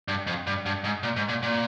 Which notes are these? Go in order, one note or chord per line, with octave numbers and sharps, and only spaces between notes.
G2
F2
G2
G2
G#2
A#2
G#2
A#2
A#2